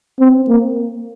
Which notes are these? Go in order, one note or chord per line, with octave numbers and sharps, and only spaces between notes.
C4
A#3